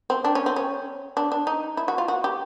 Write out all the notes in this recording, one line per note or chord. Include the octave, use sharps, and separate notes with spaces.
C4
D4
C#4
C4
C#4
D4
D4
D#4
E4
F#4
F4
F#4
G4